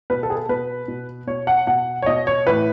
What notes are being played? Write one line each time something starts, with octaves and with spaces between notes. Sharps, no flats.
B2 B4
A4
G#4
A4
B2 B4
B2
B2 C#5
F#5
B2 F#5
C#5
B2 D#5
C#5
A2 E3 B4